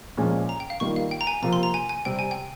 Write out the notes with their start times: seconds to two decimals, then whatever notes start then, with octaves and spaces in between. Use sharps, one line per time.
0.17 A#2 F3 G#3 C#4
0.49 A#5
0.60 G5
0.70 F5
0.80 D#3 G3 A#3 F4 C#6
0.96 F5
1.11 G5
1.21 A#5
1.27 G#5
1.42 C3 F3 A#3 F4 A#5
1.53 C6
1.63 A#5
1.74 G#5
1.89 G#5
2.05 C3 G3 C4 G5
2.19 G#5
2.31 G5